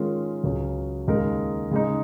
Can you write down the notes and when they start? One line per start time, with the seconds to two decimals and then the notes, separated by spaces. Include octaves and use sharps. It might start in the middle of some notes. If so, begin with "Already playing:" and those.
Already playing: D#3 G#3 C#4 F4
0.44 C#2 C#3 F#3 C#4 G#4
1.07 D#2 C#3 G#3 D#4 A#4
1.71 C#3 G#3 D#4